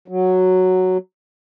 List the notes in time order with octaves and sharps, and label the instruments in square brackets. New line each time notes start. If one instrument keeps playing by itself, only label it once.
[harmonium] F#3